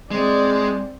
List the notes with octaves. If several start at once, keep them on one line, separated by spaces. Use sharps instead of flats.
G#3 C4 D5